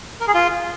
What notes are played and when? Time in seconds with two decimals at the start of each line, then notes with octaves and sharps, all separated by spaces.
0.20 A#4
0.27 G#4
0.34 F4